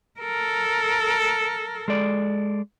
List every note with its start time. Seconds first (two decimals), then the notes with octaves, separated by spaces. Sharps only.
0.20 A4 A#4
1.88 G#3 A4 D5